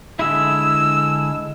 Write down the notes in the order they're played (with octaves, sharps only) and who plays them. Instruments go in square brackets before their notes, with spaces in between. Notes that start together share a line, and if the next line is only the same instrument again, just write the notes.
[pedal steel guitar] D3 G#3 E4 [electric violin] E6